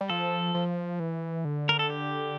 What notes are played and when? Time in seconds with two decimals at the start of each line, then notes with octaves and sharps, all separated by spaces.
0.01 G3
0.10 F3 A4
0.54 F3
1.00 E3
1.45 D3
1.69 A#4
1.79 A4
1.90 G4